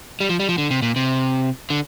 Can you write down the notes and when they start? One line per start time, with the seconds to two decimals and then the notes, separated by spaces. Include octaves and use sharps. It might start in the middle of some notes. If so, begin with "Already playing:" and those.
0.20 G3
0.29 F3
0.40 G3
0.49 F3
0.58 D3
0.71 C3
0.82 A#2
0.96 C3
1.70 D3